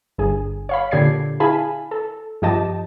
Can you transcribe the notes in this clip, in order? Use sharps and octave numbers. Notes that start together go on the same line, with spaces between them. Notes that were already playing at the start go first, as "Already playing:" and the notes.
G1 G#4
C#5 F5 B5
A#2 D3 G4 D5 G#6 C7
E4 G#4 F5 G#5 A5 B5
A4
G2 F3 G4 D#5 A5